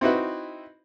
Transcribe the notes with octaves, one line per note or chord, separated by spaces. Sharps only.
C4 D#4 E4 F#4 B4